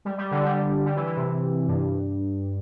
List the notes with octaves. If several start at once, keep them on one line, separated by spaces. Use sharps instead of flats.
G3
G3
D3
G3
G3
E3
E3
C3
G2